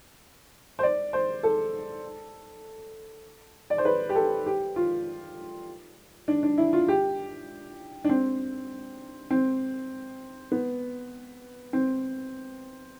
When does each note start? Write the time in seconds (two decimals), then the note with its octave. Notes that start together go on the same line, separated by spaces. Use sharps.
0.79 C5
0.83 D5
1.13 C5
1.43 A4
3.70 D5
3.78 C5
3.85 B4
4.09 G4
4.15 A4
4.46 G4
4.76 F4
6.28 D4
6.43 D4
6.58 E4
6.73 F4
6.88 G4
8.04 D4
8.09 C4
9.30 C4
10.52 B3
11.73 C4